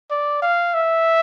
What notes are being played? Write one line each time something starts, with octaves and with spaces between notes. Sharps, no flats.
D5
F5
E5